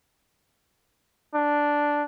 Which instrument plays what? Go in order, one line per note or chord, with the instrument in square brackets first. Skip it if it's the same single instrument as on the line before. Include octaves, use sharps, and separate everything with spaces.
[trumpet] D4